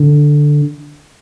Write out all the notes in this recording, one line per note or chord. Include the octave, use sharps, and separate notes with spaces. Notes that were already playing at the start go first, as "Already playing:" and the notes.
Already playing: D3